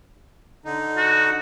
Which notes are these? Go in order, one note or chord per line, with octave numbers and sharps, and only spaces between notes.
D3 D#4
F#4